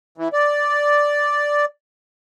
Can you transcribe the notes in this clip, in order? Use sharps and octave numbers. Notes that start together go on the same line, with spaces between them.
E3
D5